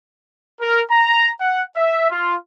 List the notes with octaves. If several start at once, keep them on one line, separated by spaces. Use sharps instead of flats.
A#4
A#5
F#5
E5
F4